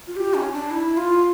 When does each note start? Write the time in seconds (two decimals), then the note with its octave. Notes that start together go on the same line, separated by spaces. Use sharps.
0.07 F4
0.16 G4
0.34 C#4
0.52 D4
0.71 E4
0.97 F4